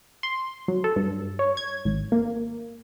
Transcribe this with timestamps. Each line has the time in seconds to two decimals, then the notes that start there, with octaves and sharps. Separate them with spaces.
0.23 C6
0.68 F#3
0.84 A4
0.96 G2
1.39 C#5
1.57 G#6
1.85 G#1
2.12 A#3